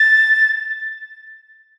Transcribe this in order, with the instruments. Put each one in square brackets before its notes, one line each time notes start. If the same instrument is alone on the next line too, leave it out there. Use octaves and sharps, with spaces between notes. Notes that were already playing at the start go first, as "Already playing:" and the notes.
Already playing: [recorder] A6